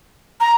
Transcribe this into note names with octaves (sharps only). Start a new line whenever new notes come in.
A#5